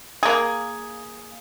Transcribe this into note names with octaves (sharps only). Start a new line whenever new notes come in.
A#3 G#4